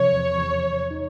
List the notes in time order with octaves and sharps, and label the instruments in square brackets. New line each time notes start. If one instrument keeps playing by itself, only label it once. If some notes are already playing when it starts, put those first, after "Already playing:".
Already playing: [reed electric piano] C3 F3 [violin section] C#5
[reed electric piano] E2
E2
E2
D#4